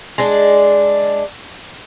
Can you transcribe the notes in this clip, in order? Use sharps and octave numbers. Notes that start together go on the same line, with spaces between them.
G#3 D4